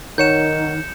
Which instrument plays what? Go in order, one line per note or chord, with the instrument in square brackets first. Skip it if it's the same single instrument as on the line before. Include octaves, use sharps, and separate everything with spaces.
[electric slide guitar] D#3 [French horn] D#4 [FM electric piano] A#4 C#5 F#5 [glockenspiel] G6 C#7 E7